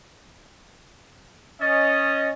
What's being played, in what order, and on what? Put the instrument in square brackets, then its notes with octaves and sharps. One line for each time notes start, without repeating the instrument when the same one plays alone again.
[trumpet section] C#4 D#5 [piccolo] A6